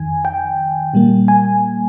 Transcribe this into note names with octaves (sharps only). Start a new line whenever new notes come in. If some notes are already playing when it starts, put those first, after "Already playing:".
Already playing: F2 D#3 G#5
G5
A#2 G3 A#3
G#5